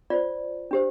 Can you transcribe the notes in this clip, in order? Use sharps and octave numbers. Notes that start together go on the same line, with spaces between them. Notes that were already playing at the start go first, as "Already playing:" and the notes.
F4 C5 D5
D4 G4 C5